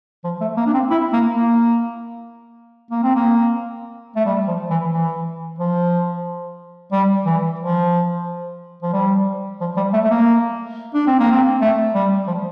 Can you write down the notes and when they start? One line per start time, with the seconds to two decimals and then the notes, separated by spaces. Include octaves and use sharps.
0.24 F3
0.41 A3
0.57 A#3
0.66 D4
0.74 C4
0.90 E4
1.13 A#3
1.36 A#3
2.91 A#3
3.03 C4
3.15 A#3
4.16 A3
4.26 G3
4.47 F3
4.70 E3
4.92 E3
5.59 F3
6.92 G3
7.26 E3
7.59 F3
8.82 F3
8.93 G3
9.61 F3
9.77 G3
9.93 A3
10.04 A3
10.11 A#3
10.94 D4
11.07 C4
11.19 A#3
11.32 C4
11.61 A3
11.95 G3
12.28 F3